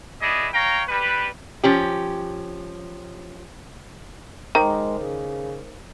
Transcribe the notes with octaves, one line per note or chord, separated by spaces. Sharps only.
B3 E4 G#4 D5 D#5
C#5 F5 G5 A#5
G3 B4
F3 C#4 G4
D#3 G#3 A#4 C5 A#5 D6
C#3